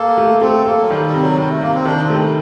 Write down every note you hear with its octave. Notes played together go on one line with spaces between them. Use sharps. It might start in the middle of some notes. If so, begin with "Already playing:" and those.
Already playing: A#3 A4
A3
A3 C4
A#3 A4
F#3
D#3 G3
G3
C3
F#3
C3 G3
A3
C3 A#3
C4
D#3 D4
C4
A3
G3